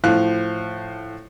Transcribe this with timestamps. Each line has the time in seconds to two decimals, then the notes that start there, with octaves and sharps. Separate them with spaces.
0.04 A2 F3 F5 F#6